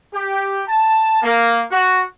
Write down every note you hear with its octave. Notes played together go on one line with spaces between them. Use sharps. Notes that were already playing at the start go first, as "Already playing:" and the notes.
G4
A5
A#3
F#4